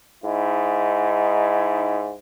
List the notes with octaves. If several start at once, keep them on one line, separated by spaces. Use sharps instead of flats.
G#2 D#4 E4